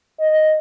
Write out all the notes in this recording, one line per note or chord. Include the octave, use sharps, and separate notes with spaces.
D#5